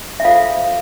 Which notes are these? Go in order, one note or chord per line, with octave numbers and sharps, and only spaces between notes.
E5
F4 A4 C5 F5